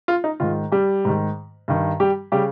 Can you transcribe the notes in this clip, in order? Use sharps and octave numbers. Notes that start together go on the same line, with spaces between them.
F4
D#4
G#2 D#3 F4
G3 G4
G#2 D#3
G2 D#3
G3 G4
C#3 G3 G4